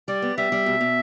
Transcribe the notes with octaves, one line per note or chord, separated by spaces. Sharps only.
G3 D5
B3
G3 E5
G3
B2
B2